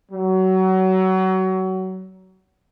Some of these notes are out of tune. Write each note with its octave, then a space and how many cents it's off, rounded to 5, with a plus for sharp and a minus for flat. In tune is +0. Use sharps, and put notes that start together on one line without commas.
F#3 +25